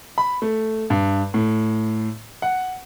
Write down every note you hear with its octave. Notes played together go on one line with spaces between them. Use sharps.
B5
A3
G2
A2
F#5